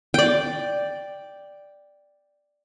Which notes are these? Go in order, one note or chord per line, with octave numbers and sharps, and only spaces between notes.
D5 G5